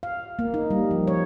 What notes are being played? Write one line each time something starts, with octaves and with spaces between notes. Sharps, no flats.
F5
A#3
D#4
G3
F3
C#5